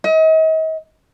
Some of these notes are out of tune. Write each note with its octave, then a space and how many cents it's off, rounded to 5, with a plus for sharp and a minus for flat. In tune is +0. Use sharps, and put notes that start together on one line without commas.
D#5 +40